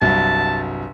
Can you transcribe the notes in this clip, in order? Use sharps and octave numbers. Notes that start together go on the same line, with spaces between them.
G1 C2 F#3 A5